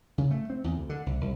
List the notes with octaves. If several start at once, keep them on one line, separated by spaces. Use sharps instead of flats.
C#3
A3
C4
E2
D2
D3
C2
C2